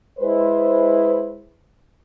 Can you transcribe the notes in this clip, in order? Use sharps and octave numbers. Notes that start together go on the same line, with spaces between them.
G#3 E4 B4 C5